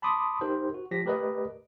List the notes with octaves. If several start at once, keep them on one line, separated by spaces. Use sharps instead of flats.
A5 B5 C6 D6 D#6
D#4 G4 A#4 C5
F#4
F3 G4 A#6 B6
A3 G4 A#4 B4 D5 D#5